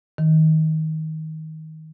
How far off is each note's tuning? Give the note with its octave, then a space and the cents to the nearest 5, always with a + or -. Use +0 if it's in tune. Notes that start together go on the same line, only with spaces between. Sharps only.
D#3 +20